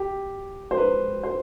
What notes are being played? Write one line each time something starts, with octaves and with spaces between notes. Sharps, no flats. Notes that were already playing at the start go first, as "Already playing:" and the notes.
Already playing: G4
C5
B4
C5